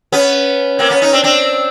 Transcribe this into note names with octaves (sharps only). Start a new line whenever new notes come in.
B3 C#4
A#3 C4
B3 C#4
C#4 D#4
C4 D4
C4 D4